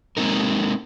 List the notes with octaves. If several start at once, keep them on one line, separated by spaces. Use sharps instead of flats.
G#3 A#3 C4 D#4 A#4